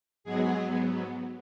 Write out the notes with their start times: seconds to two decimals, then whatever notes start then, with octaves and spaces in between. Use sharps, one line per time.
0.24 G#2 F#3 G#3 B3 G#4